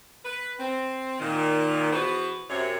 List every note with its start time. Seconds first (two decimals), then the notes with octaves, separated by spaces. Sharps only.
0.24 B4
0.59 C4
1.20 A#2 D#3
1.93 E3 B3 F#4 G#4 B4 C5
2.50 F#2 C3 C#5